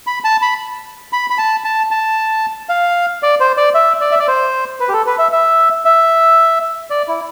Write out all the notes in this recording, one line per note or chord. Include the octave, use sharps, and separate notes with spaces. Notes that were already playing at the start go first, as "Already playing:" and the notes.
B5
A5
B5
B5
B5
A5
A5
A5
F5
D5
C5
D5
E5
D5
E5
D5
C5
B4
G4
A4
B4
E5
E5
E5
D5
E4